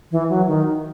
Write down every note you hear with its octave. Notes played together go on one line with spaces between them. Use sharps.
E3
F#3
D#3